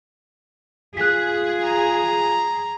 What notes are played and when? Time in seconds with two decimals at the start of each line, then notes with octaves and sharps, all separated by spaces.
0.97 F4 G#4 F#6 B6
1.63 A#5